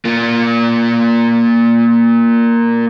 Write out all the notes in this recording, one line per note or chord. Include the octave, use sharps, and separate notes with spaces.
A#3 F4